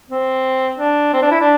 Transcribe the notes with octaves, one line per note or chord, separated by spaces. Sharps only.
C4
D4
C4
D4
E4
D4